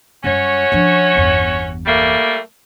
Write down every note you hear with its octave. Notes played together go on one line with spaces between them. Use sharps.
F#2 G3 C#4 F#4 C#5
F3 D4
G1 E2
G3 A3 A#3